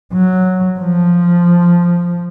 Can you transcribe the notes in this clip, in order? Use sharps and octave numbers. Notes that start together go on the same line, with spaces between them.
F#3
F3